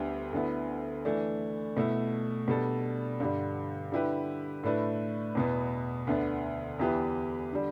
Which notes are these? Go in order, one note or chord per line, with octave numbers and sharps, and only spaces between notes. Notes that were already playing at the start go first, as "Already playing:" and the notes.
Already playing: D2 D3 G3 B3 G4
D2 D3 B3 E4
E3 A3 D4
B2 A3 E4
B2 G3 D4 A4
G2 D3 G3
D3 G3 E4 G4 B4
A2 A3 D4 B4
E2 B2 B3
D2 D3 B3 D4
E2 E3 B3 G4 B4
D3 G3